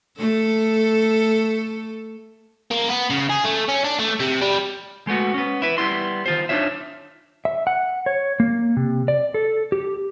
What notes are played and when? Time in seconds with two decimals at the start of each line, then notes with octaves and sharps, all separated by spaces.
0.19 A3 A4
2.71 A#3
2.88 B3
3.10 C#3
3.30 G#4
3.45 A3
3.69 C#4
3.85 D4
3.99 A3
4.20 C3
4.41 G3
5.07 G#3 A3 B3 F#4
5.34 B3 C#4
5.62 E4 B4
5.78 G3 B3 E4 C6
6.26 D#3 F4 C5
6.49 D4 D#4 F4 C#5 E5
7.45 E5
7.67 F#5
8.06 C#5
8.40 A#3
8.77 C3
9.08 D5
9.34 A4
9.72 G4